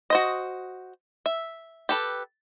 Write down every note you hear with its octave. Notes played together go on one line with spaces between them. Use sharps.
F#4 C5 D#5
E5
G4 A4 B4